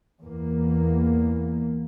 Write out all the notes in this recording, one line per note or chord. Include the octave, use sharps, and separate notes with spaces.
E2 A#3